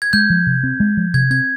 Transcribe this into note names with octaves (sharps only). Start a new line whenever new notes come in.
G#6
G#3 G6
F3
C3
C4
G#3
F3
C3 G#6
C4 G#6